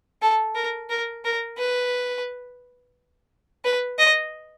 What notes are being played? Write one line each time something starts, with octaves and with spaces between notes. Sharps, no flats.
A4
A#4
A#4
A#4
B4
B4
D#5